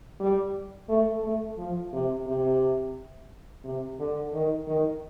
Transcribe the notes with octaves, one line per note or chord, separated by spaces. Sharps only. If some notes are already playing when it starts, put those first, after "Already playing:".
G3
A3
A3
F3
C3
C3
C3
D3
D#3
D#3